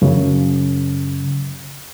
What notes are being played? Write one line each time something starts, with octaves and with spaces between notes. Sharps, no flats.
F#2 C#3